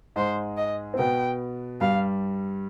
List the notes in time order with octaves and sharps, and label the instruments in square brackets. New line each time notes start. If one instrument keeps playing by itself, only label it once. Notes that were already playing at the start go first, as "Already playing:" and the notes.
[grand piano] G#2 G#3 [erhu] C5
[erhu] D#5
[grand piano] C4
[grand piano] B2 B3 [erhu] G5
[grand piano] G2 G3 [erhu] F5